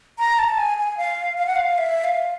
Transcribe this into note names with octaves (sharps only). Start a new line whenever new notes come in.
A#5
A5
G#5
G#5
F5
F5
F#5
F5
E5
F5